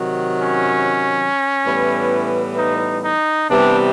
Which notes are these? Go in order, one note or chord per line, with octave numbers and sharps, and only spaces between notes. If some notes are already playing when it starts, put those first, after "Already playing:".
Already playing: C3 D#3 F#3
C#4
A2 E3 G3 B3
D#4
D#4
C3 E3 G3 B3 D4